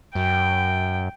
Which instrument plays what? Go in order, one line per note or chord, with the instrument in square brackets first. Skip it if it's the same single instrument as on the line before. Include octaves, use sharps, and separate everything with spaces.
[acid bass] F#2 [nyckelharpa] G5